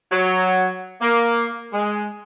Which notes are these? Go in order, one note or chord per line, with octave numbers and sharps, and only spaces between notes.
F#3
A#3
G#3